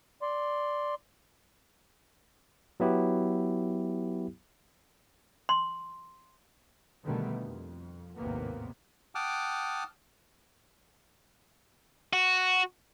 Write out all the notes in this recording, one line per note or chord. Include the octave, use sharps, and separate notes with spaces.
D5 C6
F#3 B3 E4 G4
C6
B2 D3 D#3 G3 A3 B3
F2
G#1 D#2 A2 C3 A#3 B3
F#5 G5 A5 D6 D#6 F6
F#4